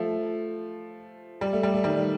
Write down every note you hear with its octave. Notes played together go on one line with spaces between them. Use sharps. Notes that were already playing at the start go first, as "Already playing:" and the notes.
Already playing: F3 A3
G3
A3
G3
A3
D#3 G3